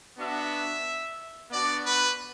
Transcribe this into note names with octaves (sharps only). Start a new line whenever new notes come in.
B3 D4 F#4 E5
B3 D4 F#4 D5
B4